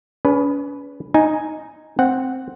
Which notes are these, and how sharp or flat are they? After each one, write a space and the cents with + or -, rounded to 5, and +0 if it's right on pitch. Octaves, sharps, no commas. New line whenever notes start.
C#4 +40 G#4 +0 B4 +0
D#4 +0 G#5 +0
C4 +0 F#5 +0